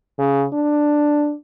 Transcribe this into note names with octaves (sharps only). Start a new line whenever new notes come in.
C#3
D4